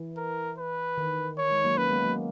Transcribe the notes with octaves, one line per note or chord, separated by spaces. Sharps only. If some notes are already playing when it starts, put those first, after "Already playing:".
Already playing: E3
A#4
B4
D#3
C#5
G#3
F#3 A#3
A#3 C#4 B4
G#3 B3
F#3 A#3